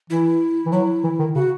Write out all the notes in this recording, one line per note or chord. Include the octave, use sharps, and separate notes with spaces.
E3 E4
E3
F#3 E4
E3
D#3
C#3 F#4